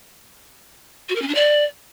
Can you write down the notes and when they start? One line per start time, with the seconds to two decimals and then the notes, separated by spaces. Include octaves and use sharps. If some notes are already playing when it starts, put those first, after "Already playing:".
1.09 F#4
1.15 A#4
1.22 C#4
1.28 D4
1.34 D5